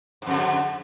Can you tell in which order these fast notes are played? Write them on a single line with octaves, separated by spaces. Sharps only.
G#2 F2 D3